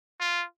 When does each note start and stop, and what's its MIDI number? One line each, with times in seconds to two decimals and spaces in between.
0.20 0.45 65